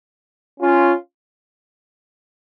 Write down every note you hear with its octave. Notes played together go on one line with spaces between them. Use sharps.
C#4 F4